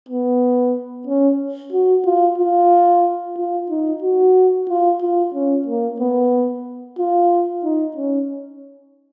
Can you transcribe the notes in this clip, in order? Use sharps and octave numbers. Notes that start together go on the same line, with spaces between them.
B3
C#4
F#4
F4
F4
F4
D#4
F#4
F4
F4
C#4
A#3
B3
F4
D#4
C#4